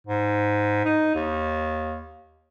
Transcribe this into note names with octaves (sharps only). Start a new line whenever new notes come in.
G#2
D#4
D#2